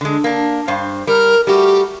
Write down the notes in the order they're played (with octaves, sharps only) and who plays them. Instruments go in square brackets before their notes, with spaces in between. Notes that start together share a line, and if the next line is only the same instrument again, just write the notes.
[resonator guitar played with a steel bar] D3 G#3
A#3 D4
G2 C5 F5
[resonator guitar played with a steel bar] G3 [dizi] A#4
[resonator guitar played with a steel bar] G3 A3 F#4 [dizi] G4